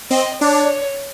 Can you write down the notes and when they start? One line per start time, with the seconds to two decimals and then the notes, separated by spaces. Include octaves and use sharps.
0.10 C4 D#5
0.41 D4 C#5